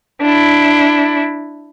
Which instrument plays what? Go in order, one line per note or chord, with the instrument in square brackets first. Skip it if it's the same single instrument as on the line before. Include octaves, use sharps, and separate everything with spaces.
[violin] D4 E4